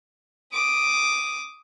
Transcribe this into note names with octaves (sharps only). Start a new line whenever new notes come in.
D6 D#6